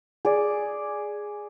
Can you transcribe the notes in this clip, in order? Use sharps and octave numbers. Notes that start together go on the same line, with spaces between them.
G#4 D5